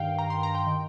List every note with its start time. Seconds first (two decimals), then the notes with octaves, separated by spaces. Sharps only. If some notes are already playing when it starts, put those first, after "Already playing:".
Already playing: G2 D#3 F5 G5
0.18 A#5
0.30 C6
0.43 A#5
0.55 G5
0.67 D#3